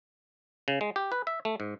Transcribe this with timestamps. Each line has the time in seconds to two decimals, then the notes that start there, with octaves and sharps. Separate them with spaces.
0.68 C#3
0.81 G#3
0.96 G4
1.12 B4
1.27 E5
1.45 A3
1.60 G#2